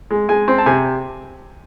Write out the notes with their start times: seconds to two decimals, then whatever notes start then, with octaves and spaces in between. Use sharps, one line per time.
0.11 G#3
0.29 G#3 G#5
0.48 C4
0.58 A5
0.66 C3 G#5